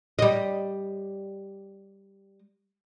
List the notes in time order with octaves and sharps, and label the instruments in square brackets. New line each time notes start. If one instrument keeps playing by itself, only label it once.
[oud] G3 D#5